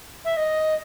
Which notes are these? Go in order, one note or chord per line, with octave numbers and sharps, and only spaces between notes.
E5
D#5